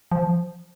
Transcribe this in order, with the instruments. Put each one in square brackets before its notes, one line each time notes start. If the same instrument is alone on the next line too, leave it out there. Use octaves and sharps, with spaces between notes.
[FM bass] F3